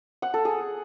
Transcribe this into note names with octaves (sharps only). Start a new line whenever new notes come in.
F#5
A4
G#4